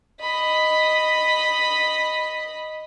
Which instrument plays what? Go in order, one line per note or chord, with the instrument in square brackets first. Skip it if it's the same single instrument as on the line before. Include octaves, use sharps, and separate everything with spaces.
[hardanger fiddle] D#5 B5